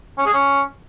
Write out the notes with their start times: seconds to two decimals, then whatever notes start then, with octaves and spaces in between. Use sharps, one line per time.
0.18 C#4
0.26 G#4
0.34 C#4